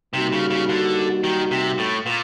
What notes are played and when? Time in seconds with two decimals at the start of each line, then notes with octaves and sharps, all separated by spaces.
0.13 C3 G3 A#3 D#4 F#4
0.32 C#3
0.50 C#3
0.69 D3
1.24 D#3
1.51 C3
1.78 A2
2.06 A#2